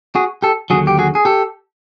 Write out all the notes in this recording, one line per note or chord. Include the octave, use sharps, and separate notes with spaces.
F#4 G#4
G4 A4
D#2 D3 F#3 F#4 G#4
G4
F#4 G#4
G#4
G4 A4